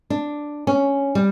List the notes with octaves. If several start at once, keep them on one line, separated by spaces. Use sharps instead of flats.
D4
C#4
G3